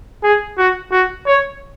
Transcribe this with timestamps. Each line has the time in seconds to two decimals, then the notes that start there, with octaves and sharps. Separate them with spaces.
0.23 G#4
0.58 F#4
0.91 F#4
1.26 C#5